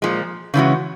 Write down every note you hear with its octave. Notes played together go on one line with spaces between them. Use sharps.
A#2 F3 G#3
C#3 E3 G#3 C#4 F#4